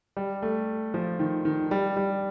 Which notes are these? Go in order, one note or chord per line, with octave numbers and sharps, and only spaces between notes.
G3
A3
F3
D#3
D#3
G3
G3